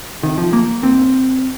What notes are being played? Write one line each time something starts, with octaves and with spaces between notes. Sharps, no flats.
C2 C3 D#3
F3
A#3
D#2 C4